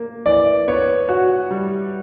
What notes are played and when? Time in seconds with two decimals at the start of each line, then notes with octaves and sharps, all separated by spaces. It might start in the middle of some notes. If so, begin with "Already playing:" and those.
Already playing: A#3
0.26 E3 D5
0.68 B3 C#5
1.09 F#4
1.51 G3